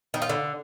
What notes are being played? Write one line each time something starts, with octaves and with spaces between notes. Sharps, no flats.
D#3
F4
D3